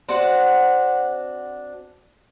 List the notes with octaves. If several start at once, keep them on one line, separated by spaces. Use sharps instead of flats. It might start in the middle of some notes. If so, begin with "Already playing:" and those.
C4 D4 F#4 F#5